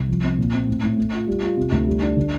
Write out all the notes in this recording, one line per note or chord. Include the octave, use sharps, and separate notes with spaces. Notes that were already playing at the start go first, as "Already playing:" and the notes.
Already playing: C2
F3
C4
A#2
C4
A2
A2
A3
F4
G3
F4
C3
D2
G3
D4
D3